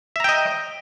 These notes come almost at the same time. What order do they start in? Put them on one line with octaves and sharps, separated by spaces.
E5 A#5 G5 D#5